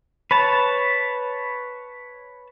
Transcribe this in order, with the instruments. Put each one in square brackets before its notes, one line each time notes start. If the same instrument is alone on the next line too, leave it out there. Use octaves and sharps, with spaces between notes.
[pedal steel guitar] B4 C#5 A5 [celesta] B5